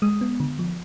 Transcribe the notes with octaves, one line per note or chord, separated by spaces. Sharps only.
G#3 D#6
B3
D3
F3